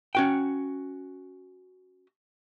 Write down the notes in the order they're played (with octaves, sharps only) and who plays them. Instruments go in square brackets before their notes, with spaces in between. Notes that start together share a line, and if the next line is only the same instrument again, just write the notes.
[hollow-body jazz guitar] C#4 F#4 G5